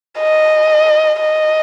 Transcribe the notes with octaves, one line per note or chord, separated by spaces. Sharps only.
D#5
D#5